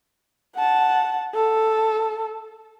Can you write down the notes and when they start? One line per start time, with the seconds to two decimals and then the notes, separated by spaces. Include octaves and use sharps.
0.56 F#5 A5
1.35 A4